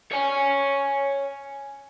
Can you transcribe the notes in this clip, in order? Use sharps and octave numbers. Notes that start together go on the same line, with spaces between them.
C#5 G#5